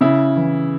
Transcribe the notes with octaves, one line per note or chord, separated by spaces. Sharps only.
C#3 E4
E3